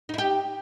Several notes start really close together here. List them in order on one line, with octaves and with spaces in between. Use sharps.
D#4 E4 G4